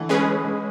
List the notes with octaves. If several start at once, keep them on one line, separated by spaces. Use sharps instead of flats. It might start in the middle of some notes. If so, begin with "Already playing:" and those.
Already playing: D3 E3 A3
G#3 C#4 G#4 B4
G#3